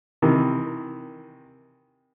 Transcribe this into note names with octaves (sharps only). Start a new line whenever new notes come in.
C3 D#3 E3